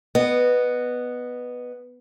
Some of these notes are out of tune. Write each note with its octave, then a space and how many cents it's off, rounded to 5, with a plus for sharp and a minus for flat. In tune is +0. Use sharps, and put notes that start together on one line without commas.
B3 +0 D#5 -25